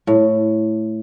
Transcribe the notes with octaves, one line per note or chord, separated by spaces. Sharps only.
A2